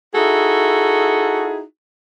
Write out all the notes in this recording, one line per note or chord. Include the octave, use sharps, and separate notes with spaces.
D#4 E4 F#4 G#4 A4